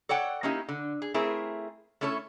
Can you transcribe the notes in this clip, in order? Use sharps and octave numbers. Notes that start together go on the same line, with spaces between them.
A4 C#5 D5 F#5 G5
A#3 C#4 D#4 E4 G4
D3
G#4
A3 C4 E4 G#4 A#4
A3 C#4 E4 A4 C#5